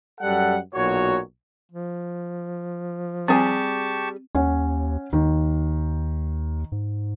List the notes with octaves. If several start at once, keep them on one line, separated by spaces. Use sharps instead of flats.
F#2 G3 A4 F#5
B1 A#2 F#4 C#5
F3
G3 C4 G4 G#4 G#5 A5 C#6
D#2 C#4 C#5 F#5
D#2 D#3
G#2